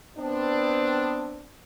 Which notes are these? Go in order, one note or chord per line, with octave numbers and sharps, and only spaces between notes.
B3 C4 D4